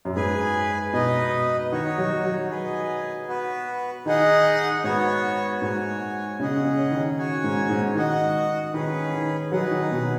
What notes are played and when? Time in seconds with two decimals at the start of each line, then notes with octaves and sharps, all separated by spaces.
0.05 F#2
0.15 G#2 G#4 B4 G#5
0.93 B2 D#4 B4 D#5
1.72 D#3 D#4 F#4 C#5
1.98 F#3
2.24 F#3
2.50 G#4 B4 D#5 G#5
3.28 B3 F#4 B4
4.06 D#3 D#4 G#4 D#5 F#5
4.84 G#2 B3 F#4 C#5
5.62 G#2 F#4 C#5 G#5
6.40 C#3 C#4 G#4 D#5 F#5
6.65 C#3
6.91 D#3
7.18 F#4 C#5 G#5
7.44 G#2
7.69 G#2
7.96 D#3 F#4 D#5 F#5
8.74 D#3 C#4 G#4 B4
9.12 D#3
9.52 F#3 D#4 G#4 B4 F#5
9.71 D#3
9.91 B2